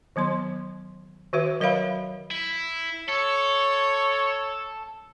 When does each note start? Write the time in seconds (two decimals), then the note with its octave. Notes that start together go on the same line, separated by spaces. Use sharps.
0.16 D#3 F#3 B3 C6
1.33 D#3 F#4 B4 E5
1.60 F#3 A#4 C#5 E5 F5 B5
2.31 E4
3.09 A4 C#5